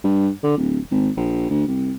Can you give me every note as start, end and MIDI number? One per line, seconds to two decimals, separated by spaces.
0.04 0.29 43
0.43 0.57 50
0.57 0.78 26
0.91 1.09 32
1.17 1.47 34
1.50 1.66 38
1.68 1.93 36